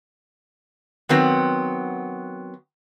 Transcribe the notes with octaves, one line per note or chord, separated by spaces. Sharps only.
D#3 F#3 B3 C4